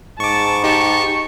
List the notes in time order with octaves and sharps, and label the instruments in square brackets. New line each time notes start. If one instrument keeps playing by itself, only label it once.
[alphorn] G#2 [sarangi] A5 [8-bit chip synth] C#6 D6
[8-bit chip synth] D#4 G4 [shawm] C#6